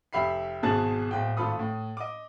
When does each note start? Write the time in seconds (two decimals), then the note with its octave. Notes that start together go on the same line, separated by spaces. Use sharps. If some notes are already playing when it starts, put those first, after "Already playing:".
0.13 F1 G4 E5 B5 C7
0.63 G#1 B2 G#4 A5 F#6 A6
1.11 D1 G5
1.37 G#1 A3 F4 A4 B5 D#6
1.59 A2
1.97 D#5 D6